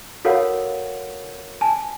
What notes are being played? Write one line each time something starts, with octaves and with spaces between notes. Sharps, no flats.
F#4 A4 A#4 C#5 F5 F#5
G#5 A5